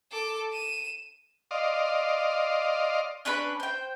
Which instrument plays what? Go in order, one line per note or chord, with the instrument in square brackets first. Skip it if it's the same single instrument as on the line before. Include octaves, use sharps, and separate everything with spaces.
[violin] A4 D6
D#7 E7
[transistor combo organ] D5 D#5 F5 C6
[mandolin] C#4 D4 B4 B5
C5 G5